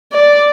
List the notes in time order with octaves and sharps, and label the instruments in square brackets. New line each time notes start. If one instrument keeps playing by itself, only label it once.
[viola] D5